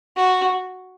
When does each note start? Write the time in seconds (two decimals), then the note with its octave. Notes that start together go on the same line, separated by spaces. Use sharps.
0.16 F#4